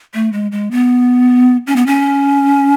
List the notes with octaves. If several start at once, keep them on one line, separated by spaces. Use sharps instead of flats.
A3
G#3
G#3
B3
C#4
B3
C#4